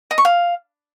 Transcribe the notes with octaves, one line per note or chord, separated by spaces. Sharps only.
D#5
C#6
F5